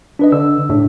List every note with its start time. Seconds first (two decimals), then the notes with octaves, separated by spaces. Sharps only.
0.19 D4 B4 D#5
0.32 D3 E6
0.69 A2 D4